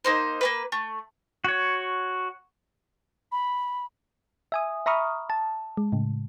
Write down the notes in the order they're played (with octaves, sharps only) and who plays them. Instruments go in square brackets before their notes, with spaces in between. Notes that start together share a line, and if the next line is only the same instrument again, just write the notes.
[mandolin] A#3 D#4 C5
A#3 C#4 B4
A3
[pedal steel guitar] F#4 C#5
[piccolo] B5
[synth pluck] E5 G#5 D#6
E5 A#5 B5 C#6 D#6 F6
A5
G#3
A2 C#3